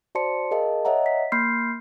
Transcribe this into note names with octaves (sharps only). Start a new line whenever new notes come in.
F#4 C5 D5 A5 C6 C#7
G#4 A#4 D#5 F5 A5
C#5 D#5 E5 F#5 A#5
B6
A#3 B5 C6 F6 G6 C7